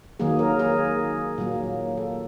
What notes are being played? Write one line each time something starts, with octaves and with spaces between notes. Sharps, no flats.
D#3 F#3 A#3 G#4
A#4
G#4
A#2 F#3 A#3
A4